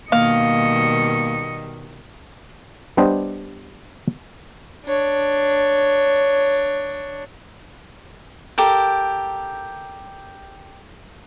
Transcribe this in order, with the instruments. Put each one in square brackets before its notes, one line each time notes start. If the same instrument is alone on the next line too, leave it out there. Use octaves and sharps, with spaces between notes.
[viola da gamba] B2 D#3 G3 [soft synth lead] A#3 [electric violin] D#5 C#7 [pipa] F5
[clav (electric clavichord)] G3 B3 D4 G4 C5 D#5
[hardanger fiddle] D4 C#5
[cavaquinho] G4 A4 A#4